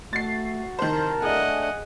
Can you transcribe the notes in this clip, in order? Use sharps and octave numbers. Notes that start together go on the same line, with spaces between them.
A3 F#4 A6 C7
C2 D#3 A#4 C5 A5
A3 D4 G#4 D#5 F#5